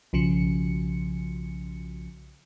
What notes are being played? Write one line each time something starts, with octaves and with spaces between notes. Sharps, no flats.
B1 C#3 F3 C#7